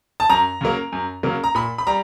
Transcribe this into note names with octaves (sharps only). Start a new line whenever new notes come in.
A5
F#2 A#5
C#3 F#3 A#3
F#2
C#3 F#3 A#3
A#5
A#2 B5
B5
G3 A#5